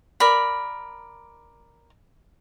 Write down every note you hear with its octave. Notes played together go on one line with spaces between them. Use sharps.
A#4 D5 B5